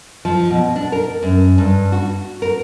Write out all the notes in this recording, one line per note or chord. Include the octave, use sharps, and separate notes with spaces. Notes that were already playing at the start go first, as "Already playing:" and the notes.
F3
B2
D4
A#4
F#2
G2
F#4
A#4